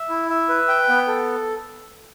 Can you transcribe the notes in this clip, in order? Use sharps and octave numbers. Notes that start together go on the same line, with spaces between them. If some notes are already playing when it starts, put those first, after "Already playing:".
Already playing: E5
E4
E5
B4
G5
B3
A4